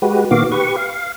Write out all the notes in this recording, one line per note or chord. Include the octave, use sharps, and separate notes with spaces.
G#3 F#4 G4 B4
A#2 D#3 B3 F#4 F5 D6
G4 B4 C#6
F5